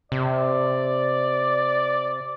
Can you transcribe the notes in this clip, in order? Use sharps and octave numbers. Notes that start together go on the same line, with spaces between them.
C3 D5